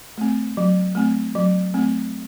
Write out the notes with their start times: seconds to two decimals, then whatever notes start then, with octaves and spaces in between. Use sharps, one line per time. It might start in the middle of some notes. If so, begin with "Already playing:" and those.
0.18 A3 C4
0.57 F#3
0.95 A3 C4
1.35 F#3
1.74 A3 C4